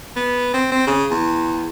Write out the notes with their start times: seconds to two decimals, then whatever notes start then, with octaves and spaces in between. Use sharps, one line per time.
0.16 B3
0.54 C4
0.72 C4
0.87 C#3
1.11 E2